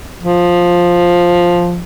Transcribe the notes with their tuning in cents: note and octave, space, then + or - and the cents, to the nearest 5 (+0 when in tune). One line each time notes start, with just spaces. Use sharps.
F3 +5